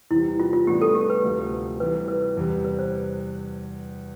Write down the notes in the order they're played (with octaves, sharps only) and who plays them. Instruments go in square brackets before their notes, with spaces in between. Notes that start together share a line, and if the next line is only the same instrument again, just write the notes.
[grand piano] E2 C3 G3 [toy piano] E4
[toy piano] F4
F4
[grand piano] A2 E3 G3 B3 D4 [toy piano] G4
[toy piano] A4
G4
B4
[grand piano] D2 C3 F3
[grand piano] C3 E3 G3 [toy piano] B4
[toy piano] B4
[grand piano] E2 C3 G3
[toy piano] B4
C5